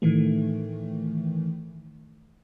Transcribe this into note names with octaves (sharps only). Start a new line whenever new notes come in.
A2 D#3 E3 A3